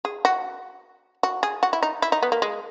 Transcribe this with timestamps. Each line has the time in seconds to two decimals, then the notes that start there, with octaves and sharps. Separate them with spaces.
0.05 G#4
0.25 F#4
1.23 F#4
1.43 G#4
1.63 F#4
1.73 E4
1.82 D#4
2.02 E4
2.12 D#4
2.23 B3
2.32 A#3
2.42 G#3